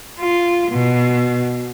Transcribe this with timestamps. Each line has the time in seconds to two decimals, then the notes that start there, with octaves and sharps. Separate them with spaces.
0.20 F4
0.72 B2